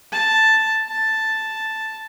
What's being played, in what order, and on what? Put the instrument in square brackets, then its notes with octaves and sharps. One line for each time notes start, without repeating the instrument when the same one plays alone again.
[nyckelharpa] A5
A5